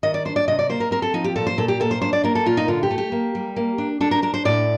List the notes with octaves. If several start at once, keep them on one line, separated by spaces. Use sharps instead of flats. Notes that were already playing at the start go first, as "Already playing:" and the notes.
D#3 D#5
D5
D4 C5
D5
C3 D#5
D5
A#3 C5
A#4
C4 A#4
A4
F3 D#4
G4
A#2 A4
C5
A#2 A4
G4
A#3 A4
C5
D4 C5
D5
A#3 A#4
A4
A#2 F4
D#4
D3 F4
G4
A3
G4
A#3
G3
A#3
D4
D4 A4
A#4
D4 A#4
C5
A2 D5